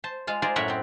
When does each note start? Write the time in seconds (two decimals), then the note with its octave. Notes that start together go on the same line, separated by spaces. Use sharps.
0.04 C5 A5
0.27 G#3 F4 F5
0.42 F4 G#4 A#4 C5 D5
0.56 F#2 A2 A#4 C#5 E5 F#5
0.68 B3 C4